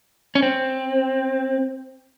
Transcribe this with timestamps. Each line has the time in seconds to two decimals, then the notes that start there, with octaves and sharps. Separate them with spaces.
0.35 C#4
0.42 C4